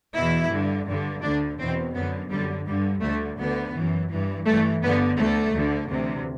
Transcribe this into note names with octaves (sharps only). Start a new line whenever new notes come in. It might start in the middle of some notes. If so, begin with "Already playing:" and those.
E2 B2 E4
G2 D3
G2 D3
D2 D3 D4
E2 B2 C4
F#2 D3 B3
F#2 D3 G3
G2 D3 G3
D2 D3 A3
D2 D3 B3
F#2 E3
G2 E3
G2 E3 A3
G2 D3 B3
D2 D3 A3
D2 D3
D2 C3 E3